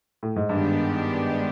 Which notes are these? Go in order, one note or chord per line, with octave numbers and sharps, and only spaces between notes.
A2
G#2
G2 D#3 G#3 B3 D4 G4